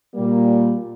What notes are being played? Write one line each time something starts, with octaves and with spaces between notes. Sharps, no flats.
A#2 G3 A#3